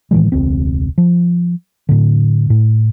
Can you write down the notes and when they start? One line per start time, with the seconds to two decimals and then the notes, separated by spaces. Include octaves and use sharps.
0.11 A2 D#3 E3 G#3
0.32 E1 C#2 C4
0.98 F3
1.89 A2 D3
2.50 A2